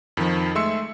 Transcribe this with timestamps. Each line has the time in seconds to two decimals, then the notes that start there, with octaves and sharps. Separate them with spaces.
0.17 F2 D#3 F3
0.55 G#3 A3 E5 C6 E6 C#7